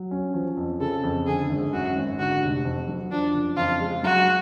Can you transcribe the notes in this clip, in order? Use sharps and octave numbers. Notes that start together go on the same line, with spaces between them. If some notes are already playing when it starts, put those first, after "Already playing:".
Already playing: F#3
C#4
F3
F2
C#3 A4
F2
D3 G#4
G#1
F#2 F#4
G#1
D3 F#4
F1
F2
F#3
F3 D4
F#1
F2 F4
G#3
F#3 F#4